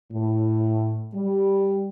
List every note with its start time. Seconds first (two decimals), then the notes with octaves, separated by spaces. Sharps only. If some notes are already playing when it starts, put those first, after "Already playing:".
0.12 A2
1.14 G3